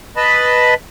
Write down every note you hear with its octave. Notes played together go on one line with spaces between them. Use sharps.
B4 D#5 A5 B5